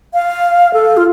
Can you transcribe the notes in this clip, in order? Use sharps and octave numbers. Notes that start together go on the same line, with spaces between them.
F5
A4
F4